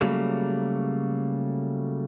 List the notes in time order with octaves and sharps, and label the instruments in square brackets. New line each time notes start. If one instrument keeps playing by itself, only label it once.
[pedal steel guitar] C#3 F#3 G3 A3 A#3